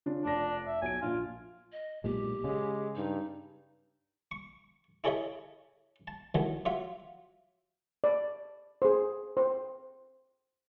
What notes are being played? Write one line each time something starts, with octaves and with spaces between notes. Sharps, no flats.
C#3 D4 F4
F1 D4 F4 A#6
E5
B1 G#5 A5 D7
A#1 A#2 F4
D#5
B1 A#2 G#3 G4
C#3 G#3
G2 D#4
C#6
E4 G#4 A4 C#5 D#5 E5
A5
D#3 E3 F#3 A3
F#3 F4 E5
D5
G#4 C5
C5